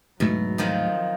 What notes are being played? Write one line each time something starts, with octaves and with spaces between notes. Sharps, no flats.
D2 G#2 B2 F#3 A3
F2 D#3 F3